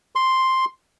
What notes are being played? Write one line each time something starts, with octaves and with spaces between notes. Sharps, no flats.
C6